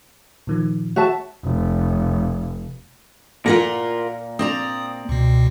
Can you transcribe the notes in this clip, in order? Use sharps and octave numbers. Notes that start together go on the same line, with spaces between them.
A#2 D#3 F3
F#4 C#5 E5 A5
F1
A#2 F4 A#4 F#5
C4 D5 A#5 D#6
C#2 B2